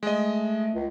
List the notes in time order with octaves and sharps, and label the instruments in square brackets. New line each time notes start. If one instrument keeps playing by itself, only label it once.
[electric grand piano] G#3 D#5 [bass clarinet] A3
[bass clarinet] C#2